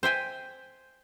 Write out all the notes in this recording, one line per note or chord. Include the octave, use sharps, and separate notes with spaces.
C5 E5 G5 G#5